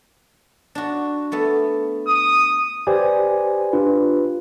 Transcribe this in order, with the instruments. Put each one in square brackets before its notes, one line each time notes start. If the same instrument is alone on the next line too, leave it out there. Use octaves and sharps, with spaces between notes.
[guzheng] D4 F#4
A3 B3 A4
[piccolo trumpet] D#6
[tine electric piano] G4 B4 C5 D5 G#5
D4 F4 B4